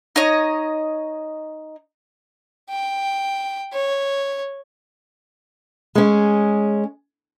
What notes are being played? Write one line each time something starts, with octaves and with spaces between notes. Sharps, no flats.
D#4 C#5 D#5
G5
C#5
G#3 C#4